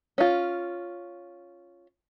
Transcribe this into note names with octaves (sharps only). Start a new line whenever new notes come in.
C#4 F4